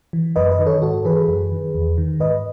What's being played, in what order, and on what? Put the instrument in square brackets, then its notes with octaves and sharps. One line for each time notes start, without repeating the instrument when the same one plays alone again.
[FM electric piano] E3
F#2 B4 D#5
B4 D#5
D#3
A4 C#5
G#2 F#4 A4
E3 G#4 B4
F#2
D#3
E2
D#3
G#2 B4 D#5